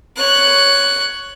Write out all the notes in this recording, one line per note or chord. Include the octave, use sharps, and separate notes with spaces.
C#5 F#6